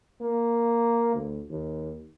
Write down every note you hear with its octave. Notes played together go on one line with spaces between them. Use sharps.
A#3
D2
D#2